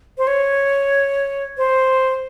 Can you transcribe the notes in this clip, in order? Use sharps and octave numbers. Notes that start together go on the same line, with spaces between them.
C5
C#5
C5